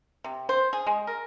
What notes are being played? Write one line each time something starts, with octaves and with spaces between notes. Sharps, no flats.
C3
C5
G#4
G#3
A#4